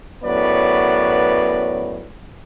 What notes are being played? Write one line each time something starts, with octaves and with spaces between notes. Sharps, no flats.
F#2 A2 B3 B4 C#5 D5